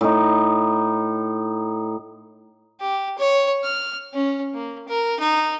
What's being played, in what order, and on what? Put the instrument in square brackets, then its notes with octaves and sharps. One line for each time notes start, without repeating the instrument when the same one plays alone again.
[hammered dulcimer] A2 D#4
[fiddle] G4
C#5
F6
C#4
A#3
A#4
D#4